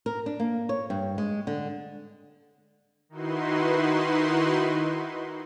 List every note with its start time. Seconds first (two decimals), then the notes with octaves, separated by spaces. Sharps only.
0.06 A#4
0.26 D4
0.40 A#3
0.69 C#5
0.90 G2
1.18 G#3
1.47 D3
3.09 D#3 D#4 E4 F#4 B4 C6